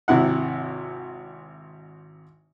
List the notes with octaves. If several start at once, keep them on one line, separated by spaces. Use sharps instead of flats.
G#1 C3 E4 F#5